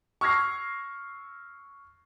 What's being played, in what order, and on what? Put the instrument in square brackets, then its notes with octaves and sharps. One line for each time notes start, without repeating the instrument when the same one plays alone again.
[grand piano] C#6 E6 F6 G#6 A#6 C7